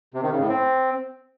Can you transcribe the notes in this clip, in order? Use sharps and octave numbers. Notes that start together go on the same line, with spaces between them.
C3
D#3
C#3
A2
C4